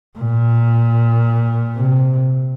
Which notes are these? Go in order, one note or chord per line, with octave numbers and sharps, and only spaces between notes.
A#2
C3